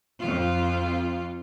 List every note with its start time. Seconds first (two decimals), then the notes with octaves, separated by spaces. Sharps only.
0.19 F2 F4